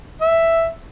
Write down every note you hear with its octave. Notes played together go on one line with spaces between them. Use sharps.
E5